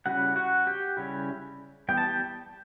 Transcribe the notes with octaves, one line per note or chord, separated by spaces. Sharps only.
C#3 G3 C#4 E4 F#4 F#5
F#4 F#5
G4 G5
C#3 G3 C#4 E4
E3 G3 B3 G5
A5
G4 G5